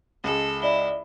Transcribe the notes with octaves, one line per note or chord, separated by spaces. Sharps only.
C#2 G#3 A4
E4 D5 D#5 G7